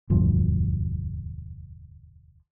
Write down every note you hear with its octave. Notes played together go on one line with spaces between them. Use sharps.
E1 D2 G2 F3